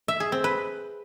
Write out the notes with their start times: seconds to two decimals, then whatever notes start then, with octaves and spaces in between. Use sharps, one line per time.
0.08 E5
0.20 G#4
0.32 C4
0.44 B4